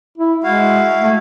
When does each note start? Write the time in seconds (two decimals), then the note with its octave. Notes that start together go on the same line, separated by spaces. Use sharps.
0.18 E4
0.44 G#3 E4 F#4 F5
1.01 A3